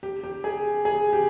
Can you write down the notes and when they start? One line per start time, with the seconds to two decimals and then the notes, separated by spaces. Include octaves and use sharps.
0.03 G4
0.24 G4
0.44 G#4
0.85 G#4
1.13 G4